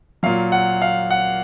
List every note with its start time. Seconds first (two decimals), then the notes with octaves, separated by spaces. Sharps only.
0.23 A#2 F#3 F5
0.52 F#5
0.82 F5
1.10 F#5